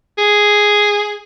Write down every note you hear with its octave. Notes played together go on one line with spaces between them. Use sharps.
G#4